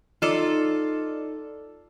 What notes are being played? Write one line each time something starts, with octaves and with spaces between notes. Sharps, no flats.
D#4 F4 A4 D5